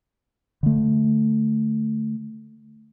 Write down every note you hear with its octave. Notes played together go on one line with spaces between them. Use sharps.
D3 A3